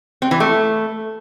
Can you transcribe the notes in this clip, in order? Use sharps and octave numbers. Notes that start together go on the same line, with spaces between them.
C4
E3
A3